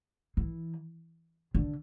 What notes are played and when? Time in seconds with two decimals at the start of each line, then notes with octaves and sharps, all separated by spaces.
0.37 E3
1.55 D3